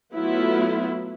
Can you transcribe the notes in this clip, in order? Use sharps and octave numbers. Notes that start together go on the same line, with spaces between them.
F#3 A3 B3 E4 F4